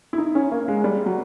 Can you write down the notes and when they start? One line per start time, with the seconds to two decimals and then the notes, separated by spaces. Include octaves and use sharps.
0.13 E4
0.18 D#4
0.35 C#4
0.51 A#3
0.68 G#3
0.84 G3
1.06 F#3